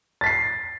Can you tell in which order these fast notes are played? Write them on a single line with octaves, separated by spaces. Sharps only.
A6 B6 C7